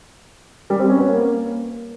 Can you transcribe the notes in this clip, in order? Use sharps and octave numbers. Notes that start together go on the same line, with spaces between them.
G3
C4
C#4
B3
A#3